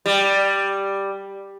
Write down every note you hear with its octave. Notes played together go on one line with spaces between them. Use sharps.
G3